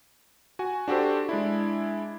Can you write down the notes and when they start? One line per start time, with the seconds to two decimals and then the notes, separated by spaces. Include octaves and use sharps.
0.59 F#4 G#5
0.88 D4 F#4 G4 A4 C5
1.29 G#3 D4 E4